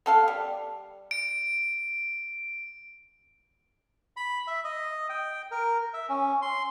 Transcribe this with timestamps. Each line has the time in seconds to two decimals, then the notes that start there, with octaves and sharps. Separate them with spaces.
0.06 B3 A4 F5
0.28 G3
1.11 D7
4.17 B5
4.47 E5
4.64 D#5
5.09 G5
5.51 A#4
5.94 E5
6.09 C#4
6.42 C6